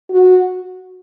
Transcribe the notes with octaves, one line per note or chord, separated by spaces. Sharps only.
F#4